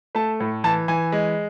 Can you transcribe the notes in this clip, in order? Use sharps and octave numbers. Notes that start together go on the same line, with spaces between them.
A3 A5
A2
E3 A5
E3 G#5
G#3